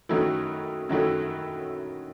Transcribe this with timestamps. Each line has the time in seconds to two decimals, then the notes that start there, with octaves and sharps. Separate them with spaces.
0.09 F#2 D#3 F#3 A3 E4
0.89 F#2 D#3 F#3 A3 E4